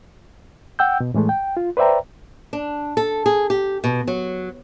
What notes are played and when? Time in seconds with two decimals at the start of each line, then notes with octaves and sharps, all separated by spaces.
0.79 F#5 G5 E6 G6
1.00 B2
1.14 A2 E3 G#3 A3
1.29 G5
1.57 F4
1.77 B4 C5 D5 E5 G5 A#5
2.53 D4
2.97 A4
3.26 G#4
3.50 G4
3.84 B2
4.08 F#3